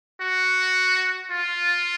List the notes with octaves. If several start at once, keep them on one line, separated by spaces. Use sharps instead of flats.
F#4
F4